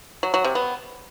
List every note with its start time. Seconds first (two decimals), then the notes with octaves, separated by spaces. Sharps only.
0.23 F#3
0.34 F#3
0.44 C3
0.55 B3